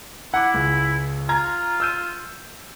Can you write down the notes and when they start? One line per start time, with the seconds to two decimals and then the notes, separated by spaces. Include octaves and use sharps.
0.34 E4 F#5 D6
0.54 C#2
1.29 F4 A#5 G#6
1.80 E6 G6 D#7